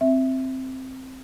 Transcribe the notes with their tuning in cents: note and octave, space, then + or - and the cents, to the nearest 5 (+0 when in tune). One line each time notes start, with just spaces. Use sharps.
C4 +0 E5 +0